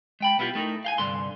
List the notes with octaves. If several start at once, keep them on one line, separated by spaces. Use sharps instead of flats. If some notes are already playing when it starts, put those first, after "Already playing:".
G#3 G5 B5
B1 B3 E4 F4 G4
A3 D#4 E4 A#4
F5 G5 G#5
C2 G2 D3 C6